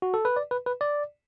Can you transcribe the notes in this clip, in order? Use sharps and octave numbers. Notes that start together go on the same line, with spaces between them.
F#4
A4
B4
D5
B4
B4
D5